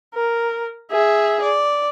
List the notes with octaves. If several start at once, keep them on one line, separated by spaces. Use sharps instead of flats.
A#4
G#4 E5
D5